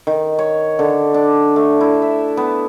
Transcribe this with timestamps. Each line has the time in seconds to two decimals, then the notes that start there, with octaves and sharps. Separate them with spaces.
0.07 D#3
0.39 C#5
0.79 D3
1.14 D4
1.56 A3
1.81 E4
2.02 E5
2.37 B3